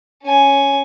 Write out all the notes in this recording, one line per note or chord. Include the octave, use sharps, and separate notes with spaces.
C#4 G#5